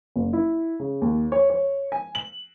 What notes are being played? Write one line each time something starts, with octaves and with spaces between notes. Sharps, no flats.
F#1
E4
C#3
D#2
C#5
C#5
G#5
F#7